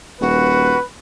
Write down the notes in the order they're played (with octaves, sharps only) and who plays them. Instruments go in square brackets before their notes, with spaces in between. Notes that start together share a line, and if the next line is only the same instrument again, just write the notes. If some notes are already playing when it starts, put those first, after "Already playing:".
[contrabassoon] D#1 [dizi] F#4 [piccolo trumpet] B4